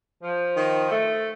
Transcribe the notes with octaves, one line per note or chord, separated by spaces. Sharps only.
F3
D#3
A3